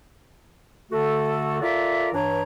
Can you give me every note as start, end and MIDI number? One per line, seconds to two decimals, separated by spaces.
0.91 1.58 50
0.91 1.58 57
0.91 1.58 66
0.91 1.58 69
1.62 2.09 65
1.62 2.09 69
1.62 2.09 70
1.62 2.09 74
1.62 2.09 76
2.13 2.42 43
2.13 2.42 52
2.13 2.42 62
2.13 2.42 73
2.13 2.42 82